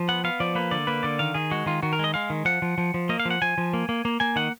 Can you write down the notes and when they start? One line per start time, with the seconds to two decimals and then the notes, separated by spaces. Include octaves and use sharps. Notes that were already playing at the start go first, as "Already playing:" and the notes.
Already playing: F3
0.08 B3 F#5
0.24 B3 F5
0.40 F3 D5
0.55 A#3 B4
0.71 D3 D5
0.87 A#3 B4
1.03 D3 D5
1.19 D#3 F5
1.34 D#3 G#4
1.51 G#3 F#4
1.66 D#3 F4
1.83 D#3 F#4
1.93 A#4
1.99 G#3 D#5
2.14 G#3 F5
2.30 D#3
2.45 F3 F#5
2.62 F3
2.78 F3
2.94 F3
3.09 A#3 D#5
3.20 F5
3.25 F3
3.31 F#5
3.42 F3 G#5
3.58 F3
3.73 A#3
3.89 A#3
4.05 A#3
4.20 A#3 G#5
4.36 D#3 F#5